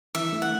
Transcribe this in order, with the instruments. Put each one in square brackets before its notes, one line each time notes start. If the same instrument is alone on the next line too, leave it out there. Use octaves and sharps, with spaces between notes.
[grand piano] E3 [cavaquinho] E5
[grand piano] A3
[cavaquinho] F#5